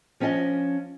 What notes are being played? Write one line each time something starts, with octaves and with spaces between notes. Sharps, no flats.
F3 C#4 D4 D#5 G#5